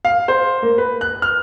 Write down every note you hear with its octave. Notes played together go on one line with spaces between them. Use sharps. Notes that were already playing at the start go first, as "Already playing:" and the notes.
F5
C5
A#3
B4
F#6
F6